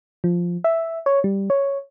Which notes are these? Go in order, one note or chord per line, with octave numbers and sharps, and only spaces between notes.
F3
E5
C#5
G3
C#5